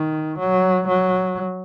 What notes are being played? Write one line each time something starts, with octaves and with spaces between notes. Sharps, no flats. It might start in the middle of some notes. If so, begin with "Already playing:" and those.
Already playing: D#3
F#3
F#3